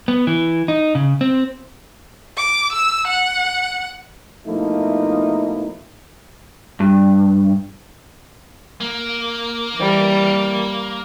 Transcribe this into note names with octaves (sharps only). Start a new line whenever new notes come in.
B3
E3
D#4
C#3
C4
D6
E6
F#5
B2 F3 A3 A#3 D#4 E4
G2
A#3
E3 G3